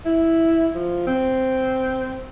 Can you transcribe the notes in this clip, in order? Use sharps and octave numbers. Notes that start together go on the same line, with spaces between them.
E4
F3
C4